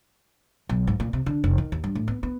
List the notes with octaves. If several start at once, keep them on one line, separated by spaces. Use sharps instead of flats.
B1
G#2
A#2
C3
D3
F1
D#3
D#2
G2
A2
B3
B3